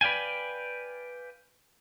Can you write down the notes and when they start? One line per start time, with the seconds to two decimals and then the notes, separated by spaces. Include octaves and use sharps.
0.01 B4 D5 F5 G5 G#5